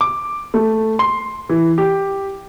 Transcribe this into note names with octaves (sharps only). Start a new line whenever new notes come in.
D6
A3
C6
E3
G4